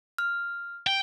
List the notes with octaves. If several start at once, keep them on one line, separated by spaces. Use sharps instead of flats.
F6
G5